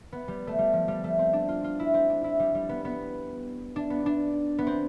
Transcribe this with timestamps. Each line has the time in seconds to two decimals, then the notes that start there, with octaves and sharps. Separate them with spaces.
0.12 B3
0.28 G3
0.47 A3
0.58 G3
0.73 F3
0.88 G3
1.04 A3
1.19 C4
1.33 D4
1.48 F4
1.64 F4
1.80 E4
1.94 C4
2.10 D4
2.24 E4
2.40 G3
2.55 G3
2.69 B3
2.85 B3
3.76 D4
3.90 B3
4.06 D4
4.59 B3
4.67 C4